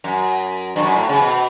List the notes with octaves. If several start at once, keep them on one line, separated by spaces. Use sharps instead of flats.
F#2
G2
F#2
A2
C#3
B2